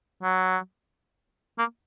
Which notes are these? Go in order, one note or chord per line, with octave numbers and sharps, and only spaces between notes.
F#3
A#3